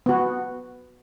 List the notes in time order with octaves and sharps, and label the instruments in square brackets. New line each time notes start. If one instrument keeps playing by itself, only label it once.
[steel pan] B3 F#4